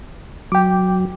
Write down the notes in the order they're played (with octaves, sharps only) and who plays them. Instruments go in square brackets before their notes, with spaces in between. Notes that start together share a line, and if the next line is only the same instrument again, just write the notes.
[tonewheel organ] F#3 [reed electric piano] G5 D6